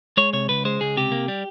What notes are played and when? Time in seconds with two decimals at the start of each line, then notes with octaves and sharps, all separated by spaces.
0.17 G#3 C#5
0.33 C3 C#5
0.49 C#2 B4
0.65 G#3 C5
0.81 C#2 G#4
0.97 C3 G4
1.12 A#3
1.28 G3